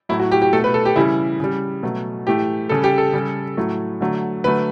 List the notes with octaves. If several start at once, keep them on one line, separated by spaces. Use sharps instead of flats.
A2 F#3 A3 E4
F#4
G4
G4
B2 A3 A4
B4
A4
G4
C#3 E3 G3 E4
C#3 G3
B2 F#3 A3
A2 E3 A3 G4
C#3 G3 A4
G4
A4
C#3 G3
A2 F#3 A3
D3 F#3 A3
D3 F#3 A3 B4